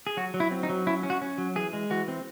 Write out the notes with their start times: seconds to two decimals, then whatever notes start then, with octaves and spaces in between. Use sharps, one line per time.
0.07 G#4
0.17 F#3 F#4
0.34 F#3
0.40 E4
0.51 C4
0.63 D#4
0.69 F#3
0.87 C#4 E4
1.03 C#4
1.10 F#4
1.22 C#4
1.38 F#3
1.56 E3 G#4
1.73 G#3
1.90 E3 F#4
2.08 C4